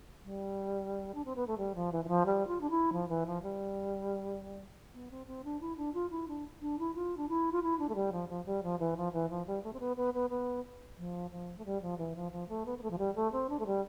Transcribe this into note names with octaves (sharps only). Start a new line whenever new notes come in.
G3
D4
C4
B3
A3
G3
F3
E3
E3
F3
G3
F4
D4
E4
F3
E3
F3
G3
B3
C4
C4
D4
E4
D4
F4
E4
D4
D4
E4
F4
D4
E4
F4
E4
D4
A3
G3
F3
F3
G3
F3
E3
F3
E3
F3
G3
A3
C4
B3
B3
B3
B3
F3
F3
A3
G3
F3
E3
F3
F3
A3
B3
B3
A3
F3
G3
A3
C4
D4
A3
G3